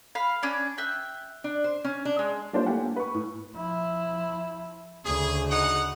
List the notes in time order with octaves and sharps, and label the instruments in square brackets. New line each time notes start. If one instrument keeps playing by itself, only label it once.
[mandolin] F5 B5
C#4 D4
E5 G5 F#6
[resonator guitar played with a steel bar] D4
C5
C#4
D4
G#3
[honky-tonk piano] G3 A#3 D4 F4 C5 C#5
A3 A#3 E4 G4 F#5 G#5
A#3
B4 C#6
A2
[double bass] F3 E4
[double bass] D2 C#3 [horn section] G#4
[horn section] D#4 F#5